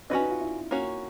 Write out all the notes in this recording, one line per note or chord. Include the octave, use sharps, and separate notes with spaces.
C#4 D4 F#4 B4 D#5
D#4
F4
E4
A#3 C#4 F#4